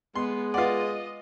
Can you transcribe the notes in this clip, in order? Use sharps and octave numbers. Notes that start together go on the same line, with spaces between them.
G#3 B3 C6
F4 B4 D5 D#5 F#5